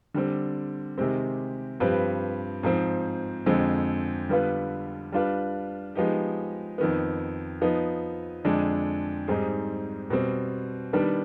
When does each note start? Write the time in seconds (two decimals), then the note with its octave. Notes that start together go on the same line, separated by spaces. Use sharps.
0.14 D3 G3 C4
0.98 C3 D#3 G#3 C4 G4
1.80 G2 F3 C4 G4 B4
2.63 G#2 F3 C4
3.46 F2 D3 G#3 C4
4.29 D3 G3 B3 F4 B4
5.12 G3 D4 F4 B4
5.95 F3 G#3 B3 D#4 G4
6.78 F2 D#3 B3
7.61 F3 B3 D#4
8.44 F2 D3 G#3 D4
9.28 G#2 G3 C4 D#4 G#4
10.10 B2 G3 C4
10.93 D#3 G3 B3 D4